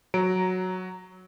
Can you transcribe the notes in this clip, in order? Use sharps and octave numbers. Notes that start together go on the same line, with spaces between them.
F#3 A#5 D7